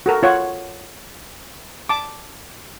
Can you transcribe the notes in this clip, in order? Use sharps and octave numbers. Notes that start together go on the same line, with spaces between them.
F#4 A4 A#4
F4 C#5 F#5
A5 D6